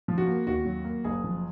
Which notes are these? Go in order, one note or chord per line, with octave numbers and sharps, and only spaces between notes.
F3
F#4
A#3
D#2 F#4
F#3
A#3
F#1 G#4
F3